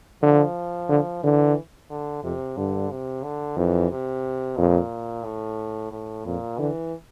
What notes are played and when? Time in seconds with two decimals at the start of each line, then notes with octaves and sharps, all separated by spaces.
0.22 D3 F3
0.89 D3
1.22 D3 E3
1.90 D3
2.24 F2 C3
2.57 G2 D3
2.91 C3
3.24 D3
3.57 F2 E3
3.91 C3
4.57 F2 A#2
5.25 A2
5.92 A2
6.25 F2 A#2
6.59 D3 E3